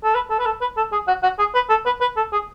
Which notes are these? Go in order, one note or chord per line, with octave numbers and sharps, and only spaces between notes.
A4
B4
A4
B4
A4
B4
A4
G#4
F#4
F#4
G#4
B4
A4
B4
B4
A4
G#4